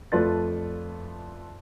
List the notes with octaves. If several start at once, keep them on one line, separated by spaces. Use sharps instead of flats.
F2 A3 F4 B4 D5 A6